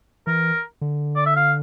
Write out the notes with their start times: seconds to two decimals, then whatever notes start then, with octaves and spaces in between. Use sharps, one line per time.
0.27 E3 A#4
0.81 D3
1.16 D5
1.26 E5
1.36 F5